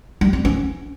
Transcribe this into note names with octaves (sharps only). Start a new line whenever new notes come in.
G3
C4
C#4